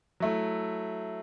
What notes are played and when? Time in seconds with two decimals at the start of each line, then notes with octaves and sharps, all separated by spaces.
0.20 F#3 A3 E4